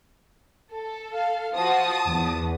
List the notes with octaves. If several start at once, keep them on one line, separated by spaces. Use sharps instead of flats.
A4
F5
F3 F#4 A5 D#6
E2